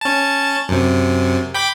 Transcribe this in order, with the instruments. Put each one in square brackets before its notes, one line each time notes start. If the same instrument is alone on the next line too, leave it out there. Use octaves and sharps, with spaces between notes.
[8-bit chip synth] C#4 A5
F#2 C3
G5 B5 D6